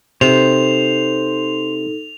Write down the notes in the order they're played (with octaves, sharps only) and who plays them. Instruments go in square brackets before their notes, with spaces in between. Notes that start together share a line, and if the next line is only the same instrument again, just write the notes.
[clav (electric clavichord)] C3 [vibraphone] D#4 A4 [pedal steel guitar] C5 [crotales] F7